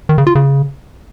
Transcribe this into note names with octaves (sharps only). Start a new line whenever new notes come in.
D#3
C#3
F4
C#3